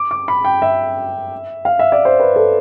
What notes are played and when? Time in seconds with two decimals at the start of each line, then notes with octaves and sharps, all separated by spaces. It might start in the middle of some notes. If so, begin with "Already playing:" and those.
Already playing: D6
0.11 D6
0.28 B5
0.45 G5
0.62 E5
1.65 F5
1.79 E5
1.92 D5
2.05 C5
2.20 B4
2.36 A4